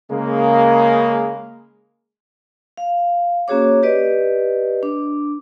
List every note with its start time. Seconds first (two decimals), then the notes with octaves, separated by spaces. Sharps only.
0.11 C#3 G#3 A#3
2.77 F5
3.48 A#3 C#4 F#4 G#4 C#5 D6
3.83 G4 B4 D5 D#5
4.83 D4 D6